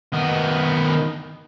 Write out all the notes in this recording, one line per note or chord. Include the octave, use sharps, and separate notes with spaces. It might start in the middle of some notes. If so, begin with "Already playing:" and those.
D#3 B3